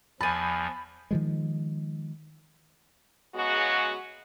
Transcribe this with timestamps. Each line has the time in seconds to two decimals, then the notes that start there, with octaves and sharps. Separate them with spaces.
0.21 E2 F3 G#5 A5 B5
1.11 D#3 F3 G#3
3.35 C#3 F#3 G#3 B3 F#4